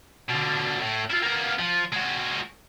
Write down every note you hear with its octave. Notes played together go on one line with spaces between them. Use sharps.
B2 D3
A2
E4 F4
A#3 B3
F3
G#3 F#4